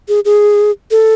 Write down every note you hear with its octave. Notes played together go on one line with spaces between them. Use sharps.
G#4
G#4
A4